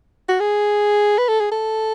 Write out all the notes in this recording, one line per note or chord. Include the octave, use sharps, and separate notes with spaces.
F#4
G#4
B4
A4
G#4
A4